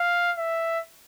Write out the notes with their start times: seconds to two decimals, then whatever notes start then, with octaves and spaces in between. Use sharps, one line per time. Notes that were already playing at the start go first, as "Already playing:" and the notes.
Already playing: F5
0.37 E5